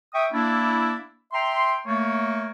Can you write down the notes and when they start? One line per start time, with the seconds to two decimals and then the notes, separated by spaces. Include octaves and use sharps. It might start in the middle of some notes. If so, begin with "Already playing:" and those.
0.14 E5 G5 C#6 D#6
0.32 A#3 D4 E4
1.33 E5 G5 A#5 C6
1.86 A3 A#3 C#5